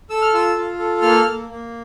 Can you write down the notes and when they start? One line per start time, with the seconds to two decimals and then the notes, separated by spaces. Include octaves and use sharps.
0.10 A4 E6
0.22 F6
0.33 F4 E6
0.56 F4
0.79 A4
1.02 A#3 F6
1.25 A#3
1.49 A#3